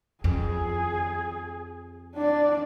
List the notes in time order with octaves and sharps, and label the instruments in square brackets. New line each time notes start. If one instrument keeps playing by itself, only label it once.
[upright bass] F2 [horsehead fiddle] G#4
[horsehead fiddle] D4 D5